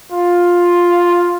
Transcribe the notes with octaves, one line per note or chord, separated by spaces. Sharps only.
F4